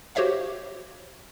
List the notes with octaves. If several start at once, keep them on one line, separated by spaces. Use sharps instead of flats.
F#4 G4 C5 C#5 E5 F5